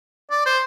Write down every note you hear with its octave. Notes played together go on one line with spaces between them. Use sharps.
D5
C5